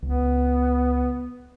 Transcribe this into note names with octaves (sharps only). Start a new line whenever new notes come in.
C#2 B3